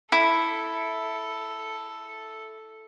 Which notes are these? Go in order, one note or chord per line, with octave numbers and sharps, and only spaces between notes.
E4 A4